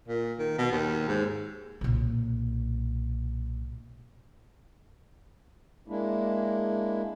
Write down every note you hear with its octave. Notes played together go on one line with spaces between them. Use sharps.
A#2
D#3
B2
D#2
G#2
B1 A#2
G#3 A#3 D4 E4